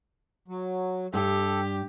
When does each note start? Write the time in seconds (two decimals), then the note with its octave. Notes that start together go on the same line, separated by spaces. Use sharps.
0.48 F#3
1.14 G2 G4 A4